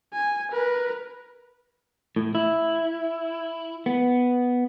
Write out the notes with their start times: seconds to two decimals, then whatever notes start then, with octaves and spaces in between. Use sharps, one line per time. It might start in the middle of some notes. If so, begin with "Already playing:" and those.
0.13 G#5
0.52 A#4 B4
2.16 A2
2.35 E4
3.86 B3